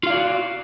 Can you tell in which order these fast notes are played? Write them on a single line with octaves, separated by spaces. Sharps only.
F4 F5 D5 F#4